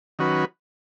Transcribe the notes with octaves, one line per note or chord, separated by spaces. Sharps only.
D#3 F#3 C#4 F#4 B4